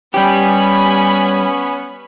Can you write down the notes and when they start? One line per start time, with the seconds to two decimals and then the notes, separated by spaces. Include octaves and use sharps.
0.14 G3 B3 C#4 G4 G#5 B5